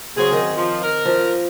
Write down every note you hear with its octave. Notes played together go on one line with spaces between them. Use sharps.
C#3 F#3 C4 G#4 C#5
D#3
F3
A#4
F3